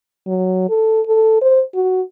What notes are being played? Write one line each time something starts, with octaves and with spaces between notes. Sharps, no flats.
F#3
A4
A4
C5
F#4